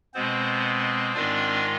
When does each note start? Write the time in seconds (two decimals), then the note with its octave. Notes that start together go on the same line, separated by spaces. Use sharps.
0.14 B2 G#3 B3 C4 C5
1.14 G#2 D#3 G#3 C4 D4 F4 D5